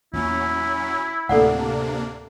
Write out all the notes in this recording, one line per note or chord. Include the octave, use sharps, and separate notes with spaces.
E2 A#2 F#3 C#4 E4
D2 A2 C3 A#3 D4 A4 D5 F#5